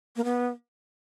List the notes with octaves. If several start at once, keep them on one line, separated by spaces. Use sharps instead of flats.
A#3
B3